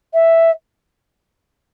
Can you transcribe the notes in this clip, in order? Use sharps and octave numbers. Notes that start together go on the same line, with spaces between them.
E5